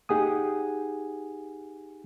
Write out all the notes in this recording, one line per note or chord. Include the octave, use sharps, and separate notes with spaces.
D#4 G4 G#4 F#5 G#5 D#6